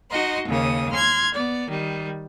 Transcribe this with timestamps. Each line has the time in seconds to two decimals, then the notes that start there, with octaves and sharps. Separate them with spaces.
0.10 D#4 F#4 D#5 C6
0.48 D#2 C#3 A#3 D#6
0.90 C6 F6 G#6
1.33 B3 D5
1.69 D#3 G3